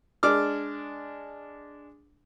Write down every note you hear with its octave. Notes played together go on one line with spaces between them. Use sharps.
G#3 D4 D6 F6